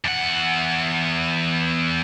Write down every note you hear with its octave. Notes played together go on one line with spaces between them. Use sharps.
E2 F#5